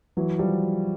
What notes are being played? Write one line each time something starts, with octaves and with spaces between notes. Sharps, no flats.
E3 F#3
F3 G3